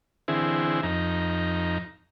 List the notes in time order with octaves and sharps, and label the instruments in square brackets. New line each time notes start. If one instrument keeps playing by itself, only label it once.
[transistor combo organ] D3 E3 C4 E4 G#4
F2 D#4 A#5